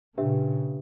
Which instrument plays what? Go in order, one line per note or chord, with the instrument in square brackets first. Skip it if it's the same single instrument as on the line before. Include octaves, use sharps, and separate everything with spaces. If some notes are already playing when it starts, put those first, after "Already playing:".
[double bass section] A#2 C#3 [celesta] D4 G4 B4 E5